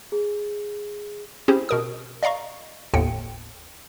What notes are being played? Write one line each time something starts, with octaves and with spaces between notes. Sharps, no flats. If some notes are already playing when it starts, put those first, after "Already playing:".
G#4
C4 C#4 E4 G4 G#4 C5
B2 A#4 D#6
D5 D#5 F5 A#5 C#6
G1 D#2 A2 D3 G5 C#7